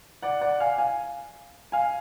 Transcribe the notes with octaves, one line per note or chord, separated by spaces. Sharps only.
D5 F#5
D5 F#5
F5 G#5
F5 G#5
F5 G#5